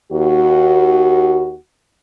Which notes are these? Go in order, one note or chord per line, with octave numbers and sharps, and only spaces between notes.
D#2 F#4